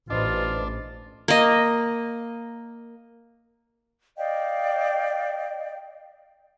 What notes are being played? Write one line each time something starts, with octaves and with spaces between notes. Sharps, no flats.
A1 D4 F4 B4 C5 D#5
A#3 D#5
D5 D#5 F5 G5